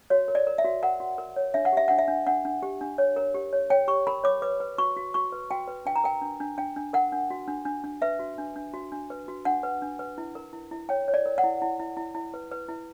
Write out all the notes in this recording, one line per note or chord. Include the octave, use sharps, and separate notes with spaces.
F#4 C#5
A#4
D5
A#4
E5
F#4
A#4 F#5
F#4
A#4
C#5
D4 E5
F#5
G4 E5
D4 F#5
E5
D4
D4 F#5
D4
G4
D4
C#5
A#4
G4
C#5
C#5 G5
G4 C#6
A#4 B5
C#5 D6
B4 D6
B4
F#4 C#6
F#4
F#4 C#6
B4
F#4 G5
B4
D4 G5
A#5
A#4 G5
D4
D4
D4 G5
D4
A#4 F#5
D4
F#4
D4
D4
D4
B4 E5
F#4
D4
D4
F#4
D4
B4
F#4
D4 F#5
B4
D4
B4
E4
A#4
E4
E4
C#5 G5
C#5
D5
A#4
F#5
E4
E4
E4
E4
E4
B4
B4
E4